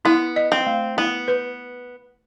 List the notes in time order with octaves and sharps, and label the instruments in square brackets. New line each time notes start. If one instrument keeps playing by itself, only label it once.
[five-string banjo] B3 [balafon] E4
[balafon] D#5
[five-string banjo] C4
[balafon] A3
[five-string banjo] B3 [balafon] E4
[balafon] B4